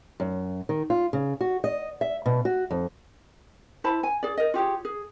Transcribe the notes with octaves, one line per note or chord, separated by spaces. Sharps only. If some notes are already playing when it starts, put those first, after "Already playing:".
F#2
D#3
F4
C#3
F#4
D#5
E5
B2
F#4
F2
E4 C5 A5 B5
G#5
G#4 D5
A#4 D#5
F4 G4 G#4 C#5
G#4